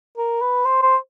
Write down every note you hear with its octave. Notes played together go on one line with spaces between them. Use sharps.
A#4
B4
C5
C5